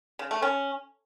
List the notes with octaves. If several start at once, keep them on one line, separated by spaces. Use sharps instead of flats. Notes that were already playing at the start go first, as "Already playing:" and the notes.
C#3
A3
C#4